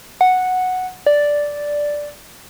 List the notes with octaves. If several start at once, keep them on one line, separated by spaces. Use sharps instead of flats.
F#5
D5